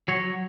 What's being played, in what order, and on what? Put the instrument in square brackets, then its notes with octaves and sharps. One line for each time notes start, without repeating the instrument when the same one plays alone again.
[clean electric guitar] F#3 C#5